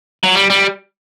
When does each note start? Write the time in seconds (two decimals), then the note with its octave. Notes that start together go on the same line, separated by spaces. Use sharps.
0.24 F#3
0.35 G3
0.50 G3